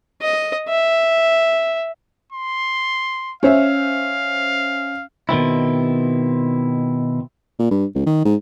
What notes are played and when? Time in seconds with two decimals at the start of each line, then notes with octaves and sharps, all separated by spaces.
0.22 D#5
0.68 E5
2.32 C6
3.43 C#4 C5 E5 F5
5.29 B2 D#3 C4 E4
7.59 A#2
7.71 G2
7.95 C#2
8.06 D#3
8.25 G#2